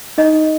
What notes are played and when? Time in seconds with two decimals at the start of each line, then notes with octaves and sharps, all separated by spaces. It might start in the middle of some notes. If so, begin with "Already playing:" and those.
0.18 D#4 D#5